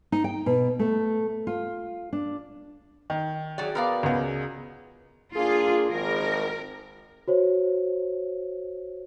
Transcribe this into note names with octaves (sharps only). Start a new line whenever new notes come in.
D#4
G5
B2
A3
F4
D4
D#3
F#3 F#4 G#4 D5 E5
B3 A#4 D5 F5 D6
C#2 B3 C#4 G#4
A#3 D4 F4 G#4
G#1 A#4
F#4 C5 C#5